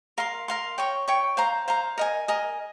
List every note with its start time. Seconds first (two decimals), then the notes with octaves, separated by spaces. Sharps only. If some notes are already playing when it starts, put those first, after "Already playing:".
0.18 A#4 F5 C6
0.48 A#4 F5 C6
0.78 C#5 G5 C#6
1.08 C#5 G5 C#6
1.37 C5 F5 A#5
1.68 C5 F5 A#5
1.98 A#4 D#5 G#5
2.28 A#4 D#5 G#5